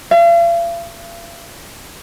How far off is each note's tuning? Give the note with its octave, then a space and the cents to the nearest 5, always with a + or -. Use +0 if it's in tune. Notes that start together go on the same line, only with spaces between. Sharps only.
F5 -45